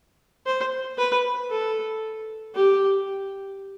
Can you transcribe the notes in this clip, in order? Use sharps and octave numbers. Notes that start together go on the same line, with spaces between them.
C5
B4
A4
G4